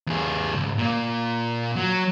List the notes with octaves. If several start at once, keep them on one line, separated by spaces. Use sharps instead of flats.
D#2 G#4
C#2 G#2
A#2 A#3
F#3